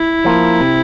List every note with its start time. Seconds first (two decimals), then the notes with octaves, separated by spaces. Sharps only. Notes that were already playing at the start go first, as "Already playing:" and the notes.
Already playing: E4
0.25 F3 A#3
0.61 C3